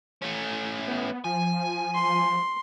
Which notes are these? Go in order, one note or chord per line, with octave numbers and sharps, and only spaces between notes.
A3 C#4
B3
F3 G#5
C6